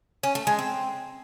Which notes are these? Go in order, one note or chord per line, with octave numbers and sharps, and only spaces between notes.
C#4
A3
G#3
C4